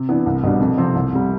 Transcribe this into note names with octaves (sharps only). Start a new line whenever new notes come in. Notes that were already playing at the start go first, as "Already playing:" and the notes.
Already playing: C3
E3 B3 D4
C2
B2 G3 D4
F2
C3 F3 C4
C2
C3 G3